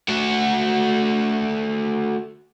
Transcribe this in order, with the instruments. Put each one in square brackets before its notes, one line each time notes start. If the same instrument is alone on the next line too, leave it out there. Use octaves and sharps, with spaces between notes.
[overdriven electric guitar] A3 F#4